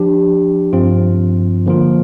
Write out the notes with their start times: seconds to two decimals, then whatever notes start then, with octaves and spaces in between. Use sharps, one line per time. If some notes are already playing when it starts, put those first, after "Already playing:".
Already playing: F3 D4 G4
0.73 G2 F3 C4 F4
1.66 D3 F3 A#3 F4